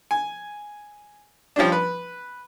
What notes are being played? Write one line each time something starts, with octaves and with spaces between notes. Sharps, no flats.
G#5
F3 G3 C#4 D4
B4